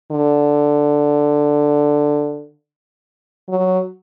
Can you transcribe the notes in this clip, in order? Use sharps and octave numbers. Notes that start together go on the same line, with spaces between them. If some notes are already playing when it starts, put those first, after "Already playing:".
D3
F#3